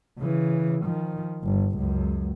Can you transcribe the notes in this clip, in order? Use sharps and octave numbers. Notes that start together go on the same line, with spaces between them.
C#3 E3
D#3 F3
G1
C#2 F#2